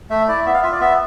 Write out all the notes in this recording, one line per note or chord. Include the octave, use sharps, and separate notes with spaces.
A3 E5
E4 D5
B3 E5
F5
F4 E5
D5
B3 E5